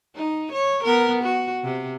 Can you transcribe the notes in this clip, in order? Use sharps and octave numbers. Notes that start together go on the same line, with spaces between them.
D#4
C#5
B3 A#4
F#4
C3